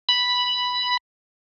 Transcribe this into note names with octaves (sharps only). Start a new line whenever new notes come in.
B5